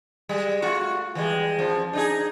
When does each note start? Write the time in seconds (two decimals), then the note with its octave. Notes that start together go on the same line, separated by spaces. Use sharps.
0.29 G3 G#3
0.62 A3 F4 F#4
1.15 E3 G3 G#3
1.59 F2 F3
1.93 D4 D#4 G#4